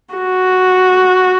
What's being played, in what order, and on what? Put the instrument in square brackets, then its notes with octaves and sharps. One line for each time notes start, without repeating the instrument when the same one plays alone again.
[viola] F#4